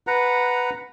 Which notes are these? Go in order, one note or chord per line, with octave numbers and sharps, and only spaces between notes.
B4 F#5 A#5